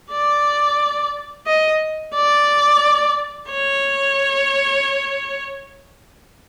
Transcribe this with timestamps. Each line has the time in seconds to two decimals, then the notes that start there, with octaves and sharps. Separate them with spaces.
0.11 D5
1.46 D#5
2.14 D5
3.51 C#5